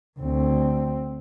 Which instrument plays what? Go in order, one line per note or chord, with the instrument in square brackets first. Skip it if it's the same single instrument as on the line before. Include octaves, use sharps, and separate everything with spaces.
[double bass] D2 C4